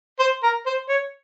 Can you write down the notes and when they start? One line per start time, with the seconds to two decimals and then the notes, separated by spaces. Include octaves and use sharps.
0.20 C5
0.43 A#4
0.66 C5
0.89 C#5